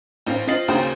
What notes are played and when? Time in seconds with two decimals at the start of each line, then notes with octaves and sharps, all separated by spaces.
0.27 A1 C4 F5
0.47 C4 F4 D#5 A6 C7 F#7
0.68 D#2 C#3 F#4 C5 G5